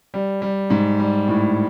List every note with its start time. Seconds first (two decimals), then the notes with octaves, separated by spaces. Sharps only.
0.14 G3
0.42 G3
0.70 G#2
0.99 G3
1.28 A2